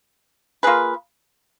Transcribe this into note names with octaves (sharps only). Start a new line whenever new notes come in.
A#3 F4 G#4 B4